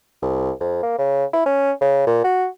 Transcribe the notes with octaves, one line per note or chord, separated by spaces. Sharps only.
C2
F2
A#3
C#3
E4
C#4
C#3
A#2
F#4